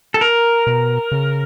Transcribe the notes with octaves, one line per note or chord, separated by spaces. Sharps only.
A4
A#4
B2
C#3